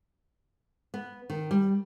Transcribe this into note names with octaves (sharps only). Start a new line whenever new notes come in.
B3
D#3
G3